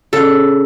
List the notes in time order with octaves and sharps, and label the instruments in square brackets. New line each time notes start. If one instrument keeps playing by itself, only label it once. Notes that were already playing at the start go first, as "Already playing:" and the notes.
[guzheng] C#3 [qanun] A4